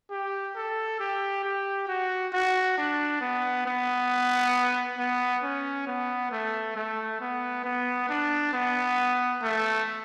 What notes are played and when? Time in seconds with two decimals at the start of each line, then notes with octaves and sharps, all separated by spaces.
0.10 G4
0.56 A4
0.99 G4
1.44 G4
1.88 F#4
2.33 F#4
2.77 D4
3.21 B3
3.66 B3
4.98 B3
5.43 C#4
5.87 B3
6.32 A3
6.76 A3
7.21 B3
7.64 B3
8.09 D4
8.53 B3
9.42 A3